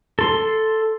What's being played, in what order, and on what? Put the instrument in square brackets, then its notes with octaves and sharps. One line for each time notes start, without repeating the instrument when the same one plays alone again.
[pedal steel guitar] A4 C6